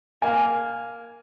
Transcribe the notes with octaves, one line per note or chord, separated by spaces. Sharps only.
A#3 G#5